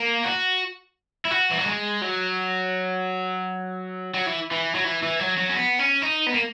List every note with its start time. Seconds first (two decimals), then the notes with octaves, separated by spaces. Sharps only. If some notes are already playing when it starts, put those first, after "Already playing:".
Already playing: A#3
0.25 F#4
1.25 E4
1.31 F#4
1.51 E3
1.58 F#3
1.66 G#3
2.02 F#3
4.14 F#3
4.27 E3
4.52 E3
4.75 F#3
4.85 E3
5.03 E3
5.20 F#3
5.37 F#3
5.49 C#4
5.56 B3
5.79 C#4
6.02 D#4
6.26 B3
6.33 A#3